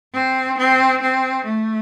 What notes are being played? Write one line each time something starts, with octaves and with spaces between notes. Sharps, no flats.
C4
C4
C4
A3